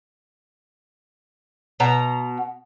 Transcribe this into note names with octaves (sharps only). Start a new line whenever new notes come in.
B2 A#5